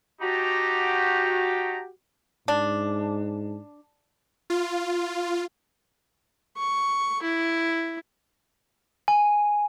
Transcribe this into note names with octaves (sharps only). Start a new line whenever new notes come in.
D#4 F#4 G4 A5 A#5
G#2 D4
F4
C#6
E4
G#5